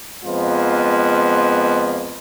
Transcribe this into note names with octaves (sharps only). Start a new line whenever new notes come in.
F2 G#3 B3 F4